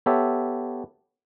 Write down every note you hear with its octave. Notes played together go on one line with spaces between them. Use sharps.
B3 G4 A4 C#5 E5